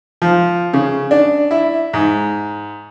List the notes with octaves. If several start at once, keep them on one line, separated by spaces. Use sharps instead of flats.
F3
C#3
D4
E4
G#2